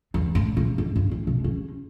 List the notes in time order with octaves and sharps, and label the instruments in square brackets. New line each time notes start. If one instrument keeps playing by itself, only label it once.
[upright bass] E2
A2
A#2
G#2
G2
A2
B2
C#3